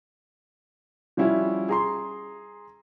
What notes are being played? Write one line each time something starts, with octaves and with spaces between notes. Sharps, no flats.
F3 G3 C#4 E4 F#4
G#4 A#5 C6